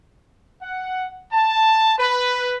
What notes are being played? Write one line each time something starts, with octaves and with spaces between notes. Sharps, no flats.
F#5
A5
B4